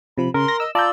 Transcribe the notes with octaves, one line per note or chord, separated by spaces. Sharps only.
C3 F3 B5
C#3 A#4 C6
A#6
D#5 E6
F4 D5 A5 A#5 E6 G6